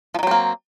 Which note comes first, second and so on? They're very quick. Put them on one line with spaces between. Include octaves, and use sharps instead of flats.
F3 D#3 F#3 C4 A#3